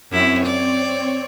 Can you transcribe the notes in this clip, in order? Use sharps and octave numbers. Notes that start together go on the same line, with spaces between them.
F#2 C4 E4 C#5
D5